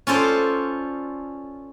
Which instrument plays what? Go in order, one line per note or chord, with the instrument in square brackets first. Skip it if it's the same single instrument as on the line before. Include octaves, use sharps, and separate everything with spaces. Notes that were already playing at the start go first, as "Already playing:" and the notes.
[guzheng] C#4 F4 A4 C5 D5